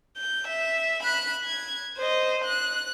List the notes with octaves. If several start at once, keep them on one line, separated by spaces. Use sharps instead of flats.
G6
E5
B5 F#6
G#6
C5 D#5
F#6